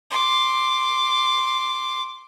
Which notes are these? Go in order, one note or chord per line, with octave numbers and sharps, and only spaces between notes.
C6 D6